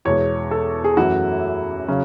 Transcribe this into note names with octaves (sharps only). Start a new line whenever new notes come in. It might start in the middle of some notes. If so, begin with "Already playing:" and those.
E2 B2 G#3 C#5
A4
G#4
F#2 E3 A3 E4 F#4
C#3 F#3 C#4